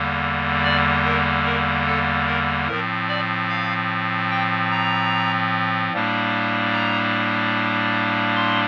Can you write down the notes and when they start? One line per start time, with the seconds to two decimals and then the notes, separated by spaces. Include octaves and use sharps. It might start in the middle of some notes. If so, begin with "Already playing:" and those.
Already playing: E2 D3 G3 A#3
0.65 D5
1.05 A#4
1.46 A#4
1.87 A4
2.27 A#4
2.68 A2 F3 C4 A#4
3.08 D5
3.49 F5
4.31 G5
4.71 A#5
5.93 A2 G3 A#3 D4
6.74 A#5
8.36 C6